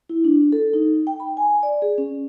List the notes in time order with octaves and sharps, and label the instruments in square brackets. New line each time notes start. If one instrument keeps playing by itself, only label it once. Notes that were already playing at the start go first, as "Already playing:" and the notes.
[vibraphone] E4
D4
A4
D#4
G5
B5
G#5
D5
G#4
C#4